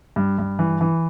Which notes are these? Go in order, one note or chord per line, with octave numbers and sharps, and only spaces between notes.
G2
G2
E3
E3